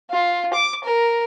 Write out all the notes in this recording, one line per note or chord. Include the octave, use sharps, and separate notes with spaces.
F4
D6
A#4